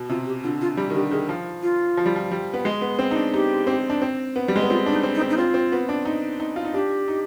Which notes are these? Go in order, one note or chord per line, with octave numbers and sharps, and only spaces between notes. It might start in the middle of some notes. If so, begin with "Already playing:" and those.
Already playing: B2
C3 F4
G4
D3 F4
F4
G3 G4
D#3
D3 G4
D#3 G#4
F3
F4
F3
G3
F3
G3
B3
G#3
B3
C4
D#4
D4
D#4 G4
C4
D4
C4
B3
G3
G#3
B3
C4 F4
D4
D#4
C4
D#4
C4
D#4
C4 F4
C4
B3
D4
D#4
D#4
F4
D#4
D4 G4
D#4